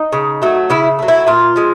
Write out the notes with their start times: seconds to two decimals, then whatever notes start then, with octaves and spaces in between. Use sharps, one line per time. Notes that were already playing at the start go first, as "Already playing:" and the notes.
Already playing: D#4
0.13 C#3
0.42 F#3 A3
0.70 C#3 E4
0.99 F#3 A3
1.08 E4
1.27 A#2 F4
1.56 F3 G#3